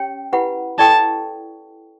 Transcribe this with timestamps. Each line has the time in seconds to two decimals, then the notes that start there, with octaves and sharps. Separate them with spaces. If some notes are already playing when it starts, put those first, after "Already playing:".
Already playing: C#4 G4 C#5 G5
0.33 E4 G4 B4 F#5 B5
0.79 E4 A4 D5 G5 A5 C#6